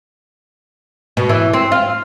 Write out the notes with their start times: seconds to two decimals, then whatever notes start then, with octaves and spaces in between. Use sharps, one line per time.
1.17 B2
1.29 E3
1.53 C4
1.72 F4